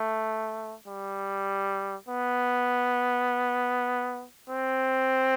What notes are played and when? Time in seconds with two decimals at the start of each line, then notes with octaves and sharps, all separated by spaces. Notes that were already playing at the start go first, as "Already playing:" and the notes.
Already playing: A3
0.87 G3
2.08 B3
4.49 C4